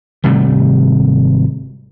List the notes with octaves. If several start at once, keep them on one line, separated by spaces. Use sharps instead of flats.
G#1 C3 G3 A3